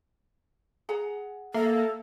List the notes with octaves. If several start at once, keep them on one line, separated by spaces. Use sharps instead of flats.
G#4 F#5 A#5
A#3 A4 E5